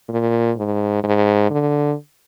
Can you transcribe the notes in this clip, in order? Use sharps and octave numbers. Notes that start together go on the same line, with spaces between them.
A#2
G#2
G#2
D3